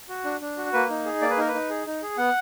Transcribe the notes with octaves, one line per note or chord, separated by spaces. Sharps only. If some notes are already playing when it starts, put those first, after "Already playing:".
F#4
D4
D4
F#4
A#3 B4
D#4
G#4
A#3 D5
B4
D#4 A#4
B4
D#4
G#4
D#4
G#4
B3 F#5